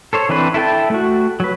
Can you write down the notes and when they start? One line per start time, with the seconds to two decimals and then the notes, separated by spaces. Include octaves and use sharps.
0.13 A4 C5 C#5
0.29 E3 C4 D4 B4 C5
0.54 E4 A4 G5 A5
0.90 A3 F#4
1.40 F#3 B4